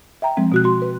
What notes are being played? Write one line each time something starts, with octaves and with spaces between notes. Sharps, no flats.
E5 G5 A#5
F3 G#3 C4
B2 F#4 F#6
F#4 C6
B4